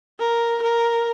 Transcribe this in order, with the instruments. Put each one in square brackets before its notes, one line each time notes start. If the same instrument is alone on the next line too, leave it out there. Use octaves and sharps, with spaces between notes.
[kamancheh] A#4
A#4